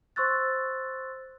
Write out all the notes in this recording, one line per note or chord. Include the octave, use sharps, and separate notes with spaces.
C5 C6 C#6 E6 F#6 A6